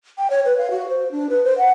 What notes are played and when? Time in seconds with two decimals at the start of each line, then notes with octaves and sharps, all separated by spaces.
0.18 G5
0.30 C#5
0.45 B4
0.58 F5
0.71 F#4
0.89 C5
1.12 D4
1.30 B4
1.44 C5
1.58 F#5